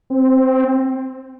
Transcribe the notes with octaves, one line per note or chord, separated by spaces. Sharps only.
C4